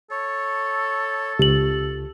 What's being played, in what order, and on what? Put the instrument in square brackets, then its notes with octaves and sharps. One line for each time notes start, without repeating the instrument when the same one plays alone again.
[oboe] A4 [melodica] C#5
[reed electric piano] C#2 [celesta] G4 F#7